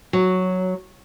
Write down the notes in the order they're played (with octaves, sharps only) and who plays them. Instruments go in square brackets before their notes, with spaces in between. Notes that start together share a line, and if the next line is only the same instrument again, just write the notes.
[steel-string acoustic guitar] F#3